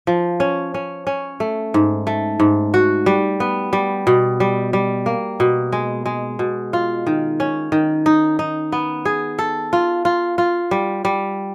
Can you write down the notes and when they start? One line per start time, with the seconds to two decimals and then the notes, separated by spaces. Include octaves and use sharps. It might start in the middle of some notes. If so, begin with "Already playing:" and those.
0.07 F3
0.40 C#4
0.74 C#4
1.07 C#4
1.40 A3
1.74 G#2
2.07 A3
2.40 G#2
2.74 F#4
3.06 G3
3.40 B3
3.73 G3
4.07 B2
4.40 G3
4.73 G3
5.06 A#3
5.40 B2
5.72 G#3
6.06 G#3
6.39 B2
6.73 F4
7.07 D#3
7.40 C#4
7.72 D#3
8.06 D#4
8.39 D#4
8.72 B3
9.05 G#4
9.39 A4
9.73 F4
10.05 F4
10.38 F4
10.71 G3
11.05 G3